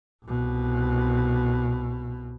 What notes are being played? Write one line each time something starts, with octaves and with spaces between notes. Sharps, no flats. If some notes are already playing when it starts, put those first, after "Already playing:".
C2 B2